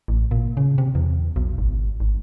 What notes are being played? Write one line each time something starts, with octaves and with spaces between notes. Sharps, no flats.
A1
A#2
C#3
C3
E2
B1
G#1
G#1